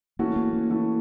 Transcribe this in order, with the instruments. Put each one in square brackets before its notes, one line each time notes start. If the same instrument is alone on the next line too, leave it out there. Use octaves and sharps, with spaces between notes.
[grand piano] E3 A3 C#4 F#4 A4 [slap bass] A#3
[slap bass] A#3
A#3
[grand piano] E3 A3 C#4 F#4 A4